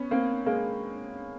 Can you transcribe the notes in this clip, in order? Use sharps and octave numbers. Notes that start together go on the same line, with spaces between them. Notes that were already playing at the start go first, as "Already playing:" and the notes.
Already playing: B3 C#4
A#3 C4
G#3 A#3